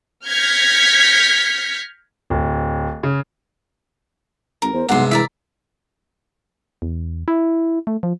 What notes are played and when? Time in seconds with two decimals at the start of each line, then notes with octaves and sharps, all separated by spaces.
0.25 F6 G6 G#6 A#6 B6 C#7
2.30 D1
3.03 C#3
4.62 A1 A#4
4.73 E2 C5
4.89 B1 G2 C3 G#3 F#5 C6
5.11 E3 A#4 D5 E5
6.82 E2
7.28 E4
7.87 A3
8.03 F3